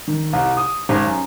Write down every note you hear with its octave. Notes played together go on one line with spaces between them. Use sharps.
D#3
C2
D#6
G#1
F#2